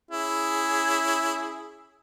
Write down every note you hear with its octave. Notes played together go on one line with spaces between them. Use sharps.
C#4 E4 G#4